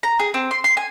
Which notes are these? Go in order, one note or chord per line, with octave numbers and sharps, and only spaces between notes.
A#5
G#4
C4
C6
C6
G#5